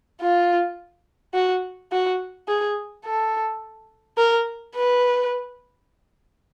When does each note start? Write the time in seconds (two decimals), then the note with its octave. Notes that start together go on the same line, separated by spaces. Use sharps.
0.21 F4
1.34 F#4
1.92 F#4
2.48 G#4
3.05 A4
4.18 A#4
4.75 B4